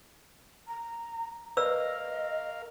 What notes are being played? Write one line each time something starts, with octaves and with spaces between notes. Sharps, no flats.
A#5
A#4 B4 D5 D#5 F5 E6